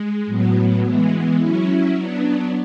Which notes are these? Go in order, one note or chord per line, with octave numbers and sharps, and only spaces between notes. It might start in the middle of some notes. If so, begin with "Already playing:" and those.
Already playing: G#3
A2 F#3 B3
E3 G#3 B3
F#3 C#4 E4
F#3 B3 D4